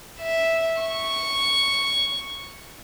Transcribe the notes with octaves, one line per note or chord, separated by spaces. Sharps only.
E5
C#6